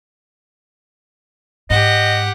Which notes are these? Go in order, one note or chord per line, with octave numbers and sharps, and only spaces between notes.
G#2 G4 D#5 F#5